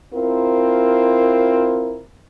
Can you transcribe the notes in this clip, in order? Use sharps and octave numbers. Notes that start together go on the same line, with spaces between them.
C4 E4 F4 A#4